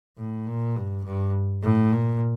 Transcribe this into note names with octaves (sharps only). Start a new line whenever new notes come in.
A2
A#2
G2
G2
A2
A#2